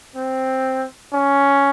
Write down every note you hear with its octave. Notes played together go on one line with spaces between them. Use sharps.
C4
C#4